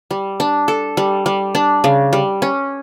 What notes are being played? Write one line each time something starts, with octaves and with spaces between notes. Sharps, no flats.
G3
D4
A4
G3
G3
D4
C#3
G3
C#4